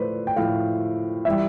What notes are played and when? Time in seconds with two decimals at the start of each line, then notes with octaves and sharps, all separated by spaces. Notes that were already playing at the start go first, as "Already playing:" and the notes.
Already playing: A2 F3 A3 B4 C5 D5
0.27 G5
0.36 A2 F3 A3 F5
1.25 E3 G3 E5